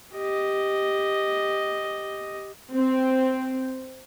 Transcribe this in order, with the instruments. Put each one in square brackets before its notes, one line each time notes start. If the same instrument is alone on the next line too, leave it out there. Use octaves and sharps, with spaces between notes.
[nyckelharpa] G4 D#5
[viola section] C4